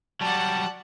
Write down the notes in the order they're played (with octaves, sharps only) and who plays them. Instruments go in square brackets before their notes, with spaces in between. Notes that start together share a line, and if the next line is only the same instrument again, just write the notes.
[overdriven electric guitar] F#3 G3 [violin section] D5 F#5 [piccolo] A5